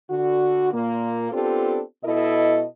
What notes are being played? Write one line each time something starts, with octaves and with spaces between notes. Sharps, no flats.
D3 F#4
A#2 A#3
B3 C4 D4 F4 G4 A4
B2 E4 A4 D#5